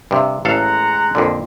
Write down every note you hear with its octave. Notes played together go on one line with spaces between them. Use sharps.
G2 C3
A1 G#3 A4 F5 F#5 A#5
F2 A#2 D3